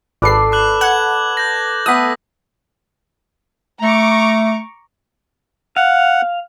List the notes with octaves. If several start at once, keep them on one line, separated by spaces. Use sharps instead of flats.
G#1 A4 B4 D5 C7
D6 F#6 F#7
F#5 G#6 F#7
G6 A#6
A3 B3 A5 D#6 E6 B6
A3 A#5 C#6 D6
F5 F#5